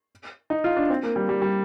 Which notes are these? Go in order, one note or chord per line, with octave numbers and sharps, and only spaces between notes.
D#4
F4
D4
C4
A#3
G3
G3
G3